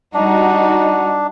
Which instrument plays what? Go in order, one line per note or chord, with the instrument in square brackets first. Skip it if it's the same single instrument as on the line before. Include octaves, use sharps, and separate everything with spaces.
[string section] G3 D#4 F#4 [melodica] D4